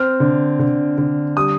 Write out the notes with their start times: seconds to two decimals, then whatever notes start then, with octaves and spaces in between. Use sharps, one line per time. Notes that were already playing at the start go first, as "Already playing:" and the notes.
Already playing: C4 F6
0.20 D3
0.59 D3
0.98 D3
1.37 G3 D#6